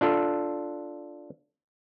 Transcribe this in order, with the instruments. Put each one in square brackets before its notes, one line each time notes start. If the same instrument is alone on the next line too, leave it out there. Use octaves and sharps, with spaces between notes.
[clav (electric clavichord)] D4 F4 A4